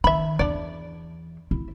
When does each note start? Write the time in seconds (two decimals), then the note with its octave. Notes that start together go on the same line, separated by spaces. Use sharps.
0.04 D#3 E5 B5
0.39 E2 D4 D5
1.51 E4